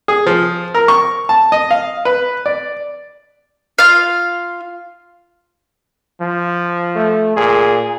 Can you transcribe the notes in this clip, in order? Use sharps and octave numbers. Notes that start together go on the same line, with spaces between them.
G#4
F3
A#4
C#6
A5
D#5
F5
B4
D5
F4 F5
F3
A3
A#2 G#4